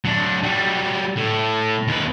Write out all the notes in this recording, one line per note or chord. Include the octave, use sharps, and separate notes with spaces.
F#3 D4
F#3 G3
A2
D#2 B4